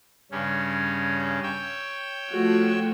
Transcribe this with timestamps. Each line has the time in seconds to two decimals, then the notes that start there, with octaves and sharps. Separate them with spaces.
0.31 G2 C#3 C#4
1.43 C#5 G5 E6
2.30 F3 A3 F#4